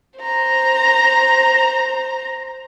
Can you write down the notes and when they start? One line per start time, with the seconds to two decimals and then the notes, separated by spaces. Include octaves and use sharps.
0.19 C5 A#5